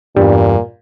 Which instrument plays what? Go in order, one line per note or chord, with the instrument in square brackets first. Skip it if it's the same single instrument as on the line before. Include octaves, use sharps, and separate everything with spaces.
[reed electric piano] E2 G2 G3 [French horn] A#2